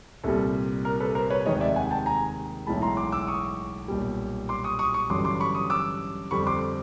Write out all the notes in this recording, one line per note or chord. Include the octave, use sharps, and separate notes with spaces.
C2 A#2 G3 A4
A#4
A4 B4
A#4 C5
B4 C#5
F1 D#2 D#3 G#3 C#5 D#5
D5 E5
F#5 G#5
G5 A5
G#5 A#5
B1 A2 E3 G#3 A5 B5
A#5 C6
C6 D6
D6 E6
C#6 D#6
B1 A#2 G3
C6 D6
C#6 D#6
C#6 D#6
C#6 D#6
A1 G2 D3 F#3 C6 D6
C6 D6
B5 C#6
C#6 D#6
D6 E6
F2 D3 G3 B5 C#6
C6 D6